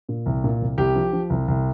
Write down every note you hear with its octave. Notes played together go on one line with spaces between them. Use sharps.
A#2
C2
A#2
C2
C2 G4
F3
F3
C2
C2